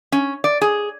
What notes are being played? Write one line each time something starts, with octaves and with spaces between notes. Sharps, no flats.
C#4
D5
G#4